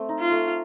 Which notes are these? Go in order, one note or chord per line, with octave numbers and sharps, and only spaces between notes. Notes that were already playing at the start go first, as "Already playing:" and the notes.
Already playing: A3 C4
D#4
F4
A3